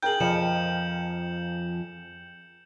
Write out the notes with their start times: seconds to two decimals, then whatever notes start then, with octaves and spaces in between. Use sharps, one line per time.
0.02 G#4 A#4 G5 G6 F#7
0.20 F2 F3 D#5 C#7 E7